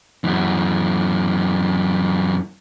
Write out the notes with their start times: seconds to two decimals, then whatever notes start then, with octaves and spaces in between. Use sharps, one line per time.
0.24 F#2 E3